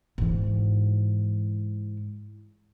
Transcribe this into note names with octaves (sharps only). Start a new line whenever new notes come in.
G#2 E3